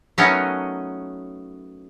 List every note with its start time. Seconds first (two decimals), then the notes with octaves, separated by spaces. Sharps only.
0.18 F#3 A3 B3 C#4 D#4 A#4